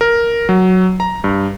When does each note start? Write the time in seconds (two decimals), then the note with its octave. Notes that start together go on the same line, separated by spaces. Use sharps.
0.01 A#4
0.49 F#3
1.00 A#5
1.24 G2